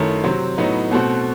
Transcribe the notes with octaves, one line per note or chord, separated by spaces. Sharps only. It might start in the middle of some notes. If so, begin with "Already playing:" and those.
Already playing: F#2 D#3 A3 E4
C3 F#3 C4
A2 F#3 B3 D#4
B2 A3 C4 F#4